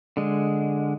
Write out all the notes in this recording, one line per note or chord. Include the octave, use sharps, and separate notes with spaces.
D3 G#3